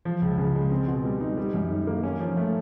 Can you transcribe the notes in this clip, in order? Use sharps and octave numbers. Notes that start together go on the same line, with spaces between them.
F3
C#2
C#3
G#3
C4
B2
G3
D#4
G3
F#2
D#3
A#3
C#4
F3
A3